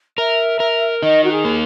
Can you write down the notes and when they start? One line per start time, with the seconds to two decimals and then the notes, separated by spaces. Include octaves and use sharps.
0.18 A#4 E5
0.60 A#4
1.02 D#4 D#5
1.23 F#4
1.31 G#4
1.45 A#3